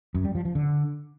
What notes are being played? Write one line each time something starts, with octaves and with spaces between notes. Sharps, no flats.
F#2
G3
F3
F3
D3